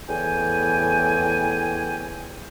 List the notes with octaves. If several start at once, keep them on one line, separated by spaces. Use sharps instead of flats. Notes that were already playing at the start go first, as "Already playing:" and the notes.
E2 A2 G5 G#5